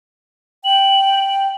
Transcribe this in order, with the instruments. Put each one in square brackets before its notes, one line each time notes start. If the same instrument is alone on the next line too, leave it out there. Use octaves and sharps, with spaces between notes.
[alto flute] G5 [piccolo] F#7